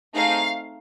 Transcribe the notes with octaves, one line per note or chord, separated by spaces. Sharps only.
A3 C4 D#4 G#4 F5